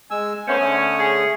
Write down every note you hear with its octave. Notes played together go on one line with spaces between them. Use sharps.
G#3 G#5 E6
A3 B3 C#4 C5
D3 A3 D#6
G#4